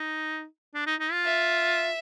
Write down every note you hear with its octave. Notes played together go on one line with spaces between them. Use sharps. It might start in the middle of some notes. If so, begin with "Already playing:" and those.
Already playing: D#4
D4
D#4
D#4
F4
E5